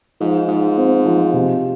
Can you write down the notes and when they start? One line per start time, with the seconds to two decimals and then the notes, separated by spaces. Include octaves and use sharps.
0.20 G#2 F3
0.48 G#2 F4
0.78 C4
1.05 F3
1.33 C3